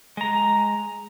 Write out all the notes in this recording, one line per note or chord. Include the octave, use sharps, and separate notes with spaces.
G#3 A#5